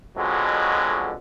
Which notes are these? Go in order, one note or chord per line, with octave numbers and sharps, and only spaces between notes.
F2 B2 D3 F#3 G#3